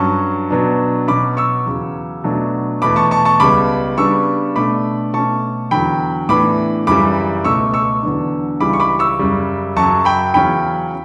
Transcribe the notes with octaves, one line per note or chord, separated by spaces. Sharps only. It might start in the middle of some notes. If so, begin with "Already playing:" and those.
Already playing: G2 F#3 C#4 A5 C#6
B2 F#3 B3 D4
B2 F#3 C#4 B5 D6
C#6 E6
E2 C#3 F#3
B2 F#3 A3 D4
E2 B2 A3 B5 D6
A5 C#6
A5 C#6
A5 C#6
C#2 C#3 G3 B3 B5 D6
C#3 G3 B3 D4 C#6 E6
B2 A3 D4 B5 D6
B2 A3 C#4 A5 C#6
E2 D3 F#3 G5 B5
A2 E3 B3 D4 B5 D6
F#2 C#3 E3 G3 B5 D6
C#2 B2 A3 C#4 C#6 E6
C#6 E6
E2 D3 F#3 B3 D4
C#2 C#3 E3 G3 B5 D6
C#6
B5 D6
C#6 E6
F#2 C#3 G3
F#2 C#3 F#3 A5 C#6
G5 B5
E2 C#3 F#3 C#4 G5 B5